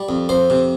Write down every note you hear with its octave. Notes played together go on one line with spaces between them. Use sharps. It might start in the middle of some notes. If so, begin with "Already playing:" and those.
Already playing: G3
F2
F2 C5
C3